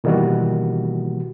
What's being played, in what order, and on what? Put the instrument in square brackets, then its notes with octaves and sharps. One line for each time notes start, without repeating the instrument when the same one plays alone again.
[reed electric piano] B2 D#3 E3 G3 A#3 F#4